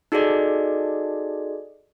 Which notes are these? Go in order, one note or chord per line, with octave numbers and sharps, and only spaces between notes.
D#4 F#4 G#4 A4 D5 D#5